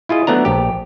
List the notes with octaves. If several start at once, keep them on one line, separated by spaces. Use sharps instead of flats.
E4 F4 G#4 D#5
F#3 A3 B3 D4 A#5
A#1 G4